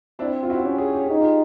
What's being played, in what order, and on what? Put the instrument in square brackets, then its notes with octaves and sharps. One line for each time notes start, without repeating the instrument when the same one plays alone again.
[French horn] C4 [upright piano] D4 E4
[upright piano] F4
E4 F#4
[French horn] C#4 [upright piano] G4
[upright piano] G#4
G4
[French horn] D#4 [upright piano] G#4
[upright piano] F4 G4